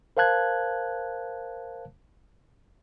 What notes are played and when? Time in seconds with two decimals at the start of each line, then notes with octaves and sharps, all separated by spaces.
0.17 A#4 C5 F5 A5 F#6 G#6